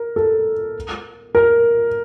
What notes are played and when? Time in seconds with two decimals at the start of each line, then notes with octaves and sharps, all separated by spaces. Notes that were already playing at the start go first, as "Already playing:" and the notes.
Already playing: A#4
0.16 A4
1.35 A#4